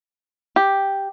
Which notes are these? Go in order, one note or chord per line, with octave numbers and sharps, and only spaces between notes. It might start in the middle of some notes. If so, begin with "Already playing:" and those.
G4